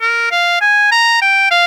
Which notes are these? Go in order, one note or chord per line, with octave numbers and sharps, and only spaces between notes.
A#4
F5
G#5
A#5
G5
F5